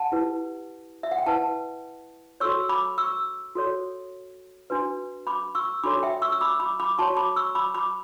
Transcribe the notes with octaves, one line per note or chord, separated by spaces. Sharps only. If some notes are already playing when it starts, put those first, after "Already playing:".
Already playing: F#5 A5
E4 G4 B4
E5
F#5
G5
E4 B4 F#5 A5
F#4 A4 C#5 C#6 E6
B5 D6
C#6 E6
F#4 A4 C#5
D4 F#4 B4
B5 D6
C#6 E6
D4 F#4 A4 C#5 B5 D6
E5 G5
C#6 E6
E6
B5 D6
B5 D6
B5 D6
F#4 C#5 A5 C#6
B5 D6
C#6 E6
B5 D6
B5 D6